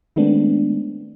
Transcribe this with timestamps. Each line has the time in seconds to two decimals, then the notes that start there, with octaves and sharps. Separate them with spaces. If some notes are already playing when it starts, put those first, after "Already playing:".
0.16 D#3 G#3 A3 B3 C4 D4